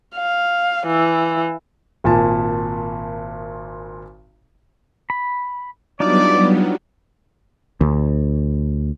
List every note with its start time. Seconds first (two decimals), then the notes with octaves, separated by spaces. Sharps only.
0.16 F5
0.86 E3
2.04 G#1 A#2 G#5 A5
5.10 B5
6.00 F#3 G3 B3 D4 D#4 F4 D5
7.81 D2